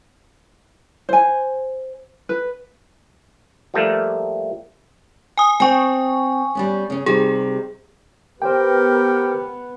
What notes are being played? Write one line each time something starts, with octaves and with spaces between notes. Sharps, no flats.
C5 G#5
B4
F3 G3 A3 A#3
G#5 D#6
C4 G5 G#5 C#6
G3 B3 C#4
C#3 C#4
C3 G3 D#4 G#4
B3 G4 A#4 C5 G5